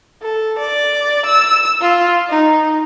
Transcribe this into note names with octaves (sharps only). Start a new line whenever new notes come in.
A4
D5
E6
F4
D#4